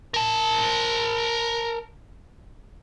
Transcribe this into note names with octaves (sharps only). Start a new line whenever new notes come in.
A#4 A5